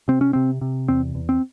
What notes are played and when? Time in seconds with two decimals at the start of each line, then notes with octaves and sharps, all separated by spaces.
0.08 C3 C4
0.21 C#4
0.33 C3 C4
0.61 C3
0.88 E2 C4
1.15 E2
1.29 C4